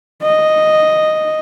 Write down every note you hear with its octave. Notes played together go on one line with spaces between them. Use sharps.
D#5